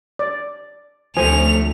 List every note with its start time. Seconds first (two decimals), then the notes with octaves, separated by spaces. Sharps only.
0.19 D5
1.17 D2 F3 A3 C5 G#5 F7